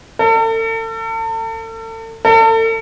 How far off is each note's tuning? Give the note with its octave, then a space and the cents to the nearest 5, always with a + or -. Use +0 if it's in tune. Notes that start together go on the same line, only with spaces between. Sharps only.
A4 +40
A4 +40